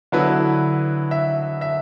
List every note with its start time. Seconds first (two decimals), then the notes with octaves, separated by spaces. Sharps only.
0.12 D3 F#3 B3 E4 B4
1.11 E5
1.61 E5